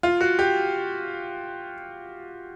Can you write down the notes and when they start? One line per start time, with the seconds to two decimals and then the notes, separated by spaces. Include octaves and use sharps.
0.03 F4
0.21 F#4
0.39 G4